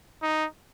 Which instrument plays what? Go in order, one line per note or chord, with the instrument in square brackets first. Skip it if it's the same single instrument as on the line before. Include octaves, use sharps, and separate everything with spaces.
[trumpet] D#4